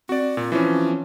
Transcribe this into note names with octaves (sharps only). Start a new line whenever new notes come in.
C4 F#4 D5
A#2
E3 F3 C#4